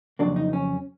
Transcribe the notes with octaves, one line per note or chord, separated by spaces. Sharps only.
F2 C#3 F#3 A#3 D4
D#4
C#4